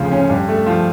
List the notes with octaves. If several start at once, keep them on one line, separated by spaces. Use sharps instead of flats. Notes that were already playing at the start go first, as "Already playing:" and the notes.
Already playing: D2 C#3 F3
C#4
G2
A3
F3